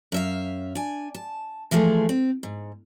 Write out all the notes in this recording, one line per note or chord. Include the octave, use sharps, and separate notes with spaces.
F#2 E5 F5
D4 G#5
A5
E3 F3 G#3 A3 G#4
C4
G#2